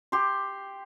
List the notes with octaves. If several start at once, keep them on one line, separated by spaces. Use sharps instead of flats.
G4 C6